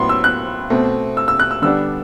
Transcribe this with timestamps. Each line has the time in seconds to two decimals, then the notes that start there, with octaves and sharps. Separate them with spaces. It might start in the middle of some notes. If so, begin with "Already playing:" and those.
Already playing: A2 F#3 B3 B5 C6
0.09 E6
0.24 F#6
0.70 B2 A3 C4
1.17 E6
1.28 E6
1.40 F#6
1.51 E6
1.62 D3 G3 B3 D4 E6